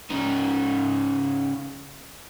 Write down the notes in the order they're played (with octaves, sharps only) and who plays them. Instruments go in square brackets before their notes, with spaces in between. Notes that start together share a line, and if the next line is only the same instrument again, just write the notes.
[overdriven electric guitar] C#3 D#4